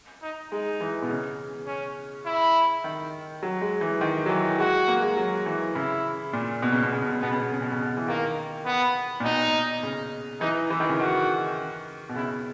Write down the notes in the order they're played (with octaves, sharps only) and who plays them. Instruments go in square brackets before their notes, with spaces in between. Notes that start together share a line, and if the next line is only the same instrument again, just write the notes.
[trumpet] D#4
[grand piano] G#3 [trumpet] D#4
[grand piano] E3
B2
C#3
[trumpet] C#4
E4
[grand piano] D#3
F#3
G#3
E3
D#3
F#3
E3
[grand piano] G#3 [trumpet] F#4
[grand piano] A#3
G#3
F#3
E3
[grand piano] C#3 [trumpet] E4
[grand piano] A#2
B2
C#3
B2
C#3
B2
C#3
[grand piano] B2 [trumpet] B3
[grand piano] C#3
B2
C#3
B2
C#3
B2
E3
[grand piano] D#3 [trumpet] A#3
[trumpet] B3
[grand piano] A#2
[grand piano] B2 [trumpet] D#4
[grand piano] C#3
[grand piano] E3 [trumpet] D#4
[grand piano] E3 [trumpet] E4
[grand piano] D#3
C#3
[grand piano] D#3 [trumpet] F#4
[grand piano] B2
[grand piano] C#3 [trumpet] E4